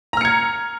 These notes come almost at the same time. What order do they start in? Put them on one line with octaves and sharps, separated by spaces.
A#5 F6 C#7 G#6